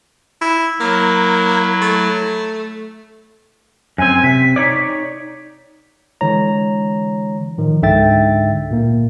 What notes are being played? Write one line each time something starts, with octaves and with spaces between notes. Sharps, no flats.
E4
F#3 A#3 E4
A3
F#2 C4 G#5
C3 B6
D#4 C#5 D5
D3 E3 G#3 C#5 A#5
A2 D#3 F3
C#2 G#2 D3 E5 G5 A6
A#2 A#3